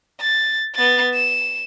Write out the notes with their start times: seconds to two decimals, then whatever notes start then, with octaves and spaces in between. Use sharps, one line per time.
0.21 A6
0.75 B3 A6
1.14 E7